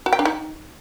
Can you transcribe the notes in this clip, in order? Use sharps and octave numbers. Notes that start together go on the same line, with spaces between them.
F#4
G5
D4
D#4